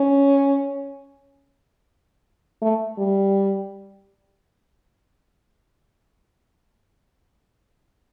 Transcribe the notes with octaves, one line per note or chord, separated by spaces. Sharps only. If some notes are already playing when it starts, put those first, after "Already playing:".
Already playing: C#4
A3
G3